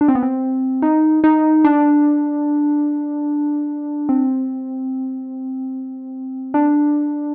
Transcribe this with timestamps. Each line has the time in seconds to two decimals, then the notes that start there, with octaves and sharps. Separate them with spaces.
0.01 D4
0.08 C4
0.15 B3
0.23 C4
0.82 D#4
1.24 D#4
1.64 D4
4.09 C4
6.54 D4